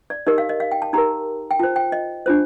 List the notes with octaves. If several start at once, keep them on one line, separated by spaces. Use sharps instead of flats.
D5
D#4 G4 A#4 D#5
F5
D#5
F5
G5
A5
D#4 G4 A#4 A#5
G5
F4 C5 A5
G5
D#5
D4 F4 C5